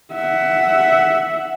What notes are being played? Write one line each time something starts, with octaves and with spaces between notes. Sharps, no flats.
E5 F#5